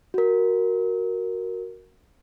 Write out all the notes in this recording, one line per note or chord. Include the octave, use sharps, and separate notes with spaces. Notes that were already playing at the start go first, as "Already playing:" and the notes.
F#4 A#4